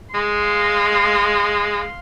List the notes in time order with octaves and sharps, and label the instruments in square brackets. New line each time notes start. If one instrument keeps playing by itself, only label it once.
[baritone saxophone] G#3 [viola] F5 C6